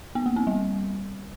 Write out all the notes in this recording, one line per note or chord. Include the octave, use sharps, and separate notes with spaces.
B3
A#3
C4
G3